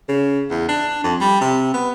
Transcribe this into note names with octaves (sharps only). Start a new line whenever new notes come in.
C#3
E2
D4
F2
G3
C3
B3